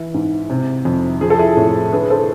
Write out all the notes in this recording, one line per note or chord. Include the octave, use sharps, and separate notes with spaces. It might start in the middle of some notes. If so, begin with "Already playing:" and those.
Already playing: E3 E4
G#2
C3
F2
F3 G#4
A4
E4 G#4
A2
D3 G#4 B4
A4 C5